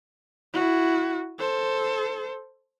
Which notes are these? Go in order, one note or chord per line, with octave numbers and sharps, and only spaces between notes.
E4 F#4
A4 C5